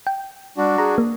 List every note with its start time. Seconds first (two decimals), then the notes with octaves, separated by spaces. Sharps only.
0.07 G5
0.57 G3 D4 F#4
0.78 G#4 A#5
0.98 A#3